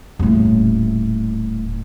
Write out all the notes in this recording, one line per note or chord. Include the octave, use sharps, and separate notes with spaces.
D#1 A2